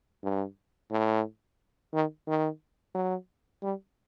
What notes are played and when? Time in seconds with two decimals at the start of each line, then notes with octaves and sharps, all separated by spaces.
0.23 G2
0.91 A2
1.94 D#3
2.28 D#3
2.95 F#3
3.63 G3